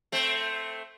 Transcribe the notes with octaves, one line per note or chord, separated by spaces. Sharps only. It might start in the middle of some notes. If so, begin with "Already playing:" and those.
A3 C4